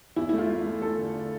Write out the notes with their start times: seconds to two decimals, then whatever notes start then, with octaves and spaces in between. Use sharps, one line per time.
0.16 E2 E4
0.29 A3 E4
0.38 F4
0.49 A3
0.66 A3
0.82 A3 A4
0.98 D3